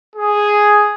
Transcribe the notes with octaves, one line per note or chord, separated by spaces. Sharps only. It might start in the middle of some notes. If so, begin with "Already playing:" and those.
G#4